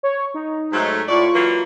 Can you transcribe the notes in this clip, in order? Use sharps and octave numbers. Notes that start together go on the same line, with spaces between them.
C#5
D#4
G#2 F#3 A3
A2 F4 D5 C#6
E3 F#3 A#3